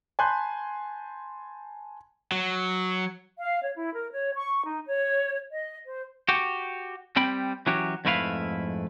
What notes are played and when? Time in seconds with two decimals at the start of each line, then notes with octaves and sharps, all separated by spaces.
0.19 G#5 A5 B5 C6 F#6 G6
2.32 F#3
3.38 F5
3.62 C#5
3.76 E4
3.94 A#4
4.11 C#5
4.35 C#6
4.67 D#4
4.86 C#5
5.51 D#5
5.87 C5
6.29 F#4 G4
7.16 G3 C4 G5 B5
7.67 E3 F#3 C#4 F#4 G4
8.05 F2 G#2 A3 E4 B4 F5